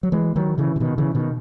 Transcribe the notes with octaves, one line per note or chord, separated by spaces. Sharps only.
F#3
E3 G#3
D#3 F#3
C#3 E3
C#3
B2 D#3
C#3 E3
B2 D#3